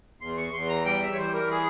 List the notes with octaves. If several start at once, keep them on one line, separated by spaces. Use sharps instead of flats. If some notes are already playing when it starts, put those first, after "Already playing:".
E2 C6
C#6
E2 C6
A#5
G3 G5
E5
C#5
E3 C5
A#4
G#4